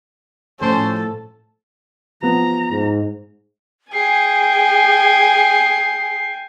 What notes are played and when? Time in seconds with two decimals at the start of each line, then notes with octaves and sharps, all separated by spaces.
0.61 A2 F3 C#4 A4 C5
2.23 F3 B3 A#5
2.70 G#2
3.93 G#4 G5 G#5 C7